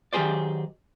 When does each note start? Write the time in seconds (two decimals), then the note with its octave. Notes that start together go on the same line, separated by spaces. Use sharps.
0.13 D#3 F#3 G4 G#4 C5 D5